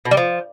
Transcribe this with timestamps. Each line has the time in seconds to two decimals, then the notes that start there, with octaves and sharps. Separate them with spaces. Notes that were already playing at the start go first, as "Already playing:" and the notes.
0.05 B2
0.11 G3
0.17 F3